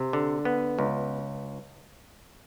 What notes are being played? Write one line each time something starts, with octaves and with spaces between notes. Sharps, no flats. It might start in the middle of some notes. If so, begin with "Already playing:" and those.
Already playing: C3
D3
B3
C#2